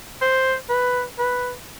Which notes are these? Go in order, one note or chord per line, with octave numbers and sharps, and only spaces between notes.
C5
B4
B4